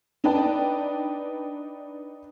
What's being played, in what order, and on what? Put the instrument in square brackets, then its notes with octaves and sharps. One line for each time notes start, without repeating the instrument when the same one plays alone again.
[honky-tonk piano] D4 D#4 B4 D5 G5 A5